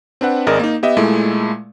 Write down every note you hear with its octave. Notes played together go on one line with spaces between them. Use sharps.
C4 D4 B4 F#5
G#1 G#4 A#4 D5 D#5
A#3 D#4
B3 G4 D#5 E5
A#2 G#3 A3 E4